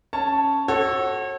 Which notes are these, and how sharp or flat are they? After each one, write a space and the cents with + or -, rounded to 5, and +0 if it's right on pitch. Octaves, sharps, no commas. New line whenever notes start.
C#4 +0 C#5 +0 A5 +0
F#4 +15 A4 -5 C#5 -35